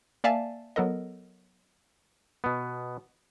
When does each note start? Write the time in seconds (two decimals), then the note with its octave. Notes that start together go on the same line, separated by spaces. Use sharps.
0.24 A#3 D5 E5 F5 G#5 A5
0.76 F#3 B3 A4 A#4 D#5
2.44 B2 B3